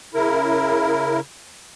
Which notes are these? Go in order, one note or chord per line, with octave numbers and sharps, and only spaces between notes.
C#3 E4 A#4